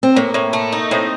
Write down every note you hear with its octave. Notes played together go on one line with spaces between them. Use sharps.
C4
A2 A#3
A2
A3
D#4
A2 C4